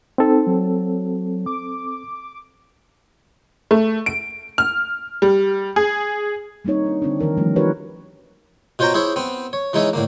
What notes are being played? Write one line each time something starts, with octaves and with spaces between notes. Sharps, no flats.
C4 D#4 A4
F#3
D6
A3
D7
F6
G3
G#4
G3 A#3 C4 D#4 C#5
D4
D3 C4 D4
D#3 E3 A#4 C#5
F3 G3 A3 C#4
D#4 F#4 G4 A#4 B4 C#5
B2 F4 C5 C#5 G5 A#5
E4 G#4 C5 C#5 E5
B3 C4
C#5
E3 G#3 C#4 D#4 C#5 E5
A2 D3 A#3